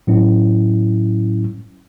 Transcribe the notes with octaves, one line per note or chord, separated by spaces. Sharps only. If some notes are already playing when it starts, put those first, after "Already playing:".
A2 F#3 C#4 E4